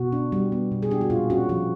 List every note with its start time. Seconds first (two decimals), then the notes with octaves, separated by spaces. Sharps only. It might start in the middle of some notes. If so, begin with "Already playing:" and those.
Already playing: B2 F#4
0.12 D4
0.32 G3
0.52 B3
0.72 B2
0.83 G#4
0.91 D4 G4
1.01 F#4
1.10 A#2 F4
1.30 C#4 F#4
1.49 F3 F#4